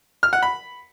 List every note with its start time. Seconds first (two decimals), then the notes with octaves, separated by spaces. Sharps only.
0.23 F6
0.33 F#5
0.43 B5